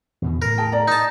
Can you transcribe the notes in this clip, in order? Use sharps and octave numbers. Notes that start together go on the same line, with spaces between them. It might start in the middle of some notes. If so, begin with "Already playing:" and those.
E2 B2 D#3
A2 A#4
G#4 G5 A5
D5 A#5
D#4 A5